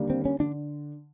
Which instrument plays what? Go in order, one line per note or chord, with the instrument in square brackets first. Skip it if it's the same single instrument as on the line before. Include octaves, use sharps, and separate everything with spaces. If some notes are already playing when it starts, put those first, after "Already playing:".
Already playing: [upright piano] D#2 D3 G3 A#3 D4
[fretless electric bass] C4
C#4
[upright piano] D3 [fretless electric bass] D4